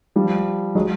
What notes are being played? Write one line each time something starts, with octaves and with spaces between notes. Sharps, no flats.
F3 G3
F#3 G#3